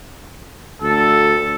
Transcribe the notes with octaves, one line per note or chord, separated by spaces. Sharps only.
D2 A4